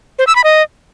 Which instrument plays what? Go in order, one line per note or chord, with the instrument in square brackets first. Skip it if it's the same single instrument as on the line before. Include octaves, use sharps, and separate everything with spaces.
[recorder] C5
E6
B5
D#5